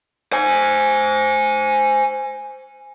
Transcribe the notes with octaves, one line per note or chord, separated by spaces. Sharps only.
C5 G#5